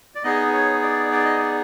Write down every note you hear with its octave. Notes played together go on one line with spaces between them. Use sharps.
D5
B3 D#4 G#4 D#5
C#5
D5
D5
D#5
D5